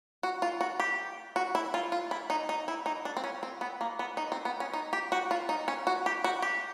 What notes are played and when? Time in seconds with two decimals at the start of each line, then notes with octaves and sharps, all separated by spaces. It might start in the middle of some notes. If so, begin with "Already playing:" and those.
0.23 F#4
0.42 F4
0.61 F#4
0.80 G4
1.36 F#4
1.55 E4
1.74 F4
1.92 F4
2.11 E4
2.30 D#4
2.49 D#4
2.68 E4
2.86 D#4
3.05 D4
3.17 C4
3.24 C#4
3.43 C4
3.61 B3
3.81 A#3
3.99 B3
4.17 D#4
4.32 C4
4.45 B3
4.60 C#4
4.73 D#4
4.93 G4
5.12 F#4
5.31 F4
5.49 D#4
5.68 C#4
5.87 F#4
6.06 G4
6.24 F#4
6.42 G4